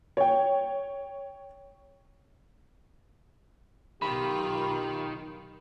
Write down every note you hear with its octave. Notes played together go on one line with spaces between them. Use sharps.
C#5 G5
B1 D#3 F4 G4 B5